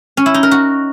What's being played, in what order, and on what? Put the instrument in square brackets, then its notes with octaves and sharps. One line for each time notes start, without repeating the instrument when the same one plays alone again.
[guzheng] C#4
E4
D#4
A#4
F#4